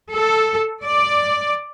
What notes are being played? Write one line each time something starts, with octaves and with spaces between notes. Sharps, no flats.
A4
D5